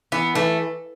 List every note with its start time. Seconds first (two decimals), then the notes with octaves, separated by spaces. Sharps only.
0.12 E3 B3
0.35 E3 A3